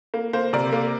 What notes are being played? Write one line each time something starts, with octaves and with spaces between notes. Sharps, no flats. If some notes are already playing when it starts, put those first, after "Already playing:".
A#3
A#3 C5
C3 A#4 D5
A#3